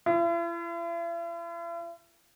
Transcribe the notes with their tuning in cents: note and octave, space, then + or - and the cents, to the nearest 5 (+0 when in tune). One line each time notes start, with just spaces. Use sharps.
E4 +45